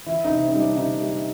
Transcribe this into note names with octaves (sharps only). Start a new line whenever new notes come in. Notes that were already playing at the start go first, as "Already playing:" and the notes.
E3 E4
D#4
C3
D#4
G3
D4
C3 D#4
G3